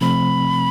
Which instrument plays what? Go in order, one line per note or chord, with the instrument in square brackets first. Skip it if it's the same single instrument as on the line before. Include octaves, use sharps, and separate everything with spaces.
[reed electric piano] C3 F3 A3 C4 [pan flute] B5